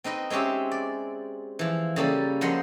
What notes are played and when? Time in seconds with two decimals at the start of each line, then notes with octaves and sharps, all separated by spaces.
0.04 C4 D#4 B4 D#5
0.30 G#3 C4 C#4 G4 E5
0.71 D5
1.59 E3 F3
1.96 C#3 G3 A#3 A4
2.41 F#2 F3 C5 D#5 F#5